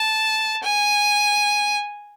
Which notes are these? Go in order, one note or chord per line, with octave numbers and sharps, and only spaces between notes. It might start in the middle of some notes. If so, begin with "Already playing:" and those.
Already playing: A5
G#5